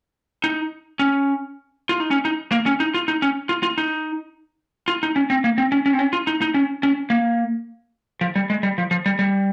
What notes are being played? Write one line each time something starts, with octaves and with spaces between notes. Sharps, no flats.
D#4
C#4
F4
D#4
C#4
D#4
A#3
C#4
D#4
F4
D#4
C#4
F4
F4
D#4
F4
D#4
C#4
C4
A#3
C4
C#4
C#4
C4
C#4
F4
D#4
D#4
C#4
C#4
A#3
F3
G3
G#3
G3
F3
F3
G3
G3